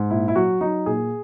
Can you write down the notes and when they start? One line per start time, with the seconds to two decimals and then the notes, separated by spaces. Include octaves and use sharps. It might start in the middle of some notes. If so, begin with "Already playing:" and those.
Already playing: G#2
0.10 A#2 E4
0.28 E4
0.36 F#3 F#4
0.61 F#3 D#4
0.86 A#2 G#4